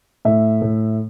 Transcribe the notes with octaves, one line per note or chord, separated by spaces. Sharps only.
A2 E5
A2